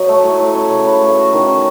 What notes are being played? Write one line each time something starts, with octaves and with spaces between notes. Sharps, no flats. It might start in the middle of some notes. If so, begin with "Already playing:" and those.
Already playing: F#3 D#5
A3
A2
A2
C#4
C#3
B4
A3
F#4
D#3
C#4